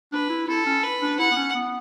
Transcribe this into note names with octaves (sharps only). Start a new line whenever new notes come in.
D4 B4
E4
E4 A4
C#4
B4
D4
E4 F#5
B3
C#4
B3